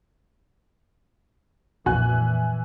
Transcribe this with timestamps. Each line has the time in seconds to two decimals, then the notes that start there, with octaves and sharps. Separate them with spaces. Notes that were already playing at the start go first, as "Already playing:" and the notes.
1.86 B1 F2 A#2 E3 F#4 G#5 F#6